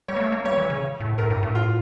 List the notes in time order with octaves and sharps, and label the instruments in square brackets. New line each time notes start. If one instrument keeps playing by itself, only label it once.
[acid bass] G3 [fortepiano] C#5
[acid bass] A#3
A3
A#3
[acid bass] G3 [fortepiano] C#5
[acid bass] E3
C#3
A2
[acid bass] A2 [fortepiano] A#4
[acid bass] G2
A2
[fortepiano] F4